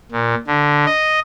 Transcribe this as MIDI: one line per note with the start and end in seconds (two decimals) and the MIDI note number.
0.12 0.35 46
0.47 0.85 50
0.86 1.20 75